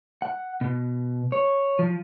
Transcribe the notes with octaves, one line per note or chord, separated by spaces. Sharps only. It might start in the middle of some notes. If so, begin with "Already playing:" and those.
F#5
B2
C#5
F3